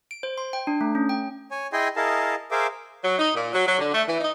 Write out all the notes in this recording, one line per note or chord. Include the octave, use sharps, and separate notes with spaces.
D7
C5
C6
G5
D4
A3
C#4
G5
C#5 G#5
E4 G#4 D#5 G5 G#5 C6
E4 G#4 A#4 D#5 F5 A5
G#4 A#4 C5 E5 F5 D6
F#3
D#4
A#2
F#3
F#3
D3
A3
E3
D#4